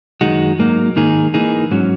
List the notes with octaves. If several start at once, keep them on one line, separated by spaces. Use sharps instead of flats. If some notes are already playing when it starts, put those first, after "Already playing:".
F#2 D#3 G#3 D#4 F#4
G#2 F#3 A#3 D#4
G#2 D#3 A#3 D#4 G#4
E3 A#3 D#4 G#4
G#2 F#3 C#4